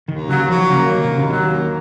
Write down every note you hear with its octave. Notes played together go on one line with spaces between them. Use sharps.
D#2 D#3
C#3 F#3
F3 F#3
C#3 A#3
D#2 D#3
C3
D#2
C#3
D#3 F#3
A#3